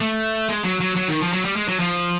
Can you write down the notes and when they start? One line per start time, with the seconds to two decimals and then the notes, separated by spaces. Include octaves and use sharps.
0.01 A3
0.49 G#3
0.65 F#3
0.81 F#3
0.96 F#3
1.08 D#3
1.21 F3
1.33 F#3
1.45 G3
1.56 G#3
1.68 F#3
1.80 F3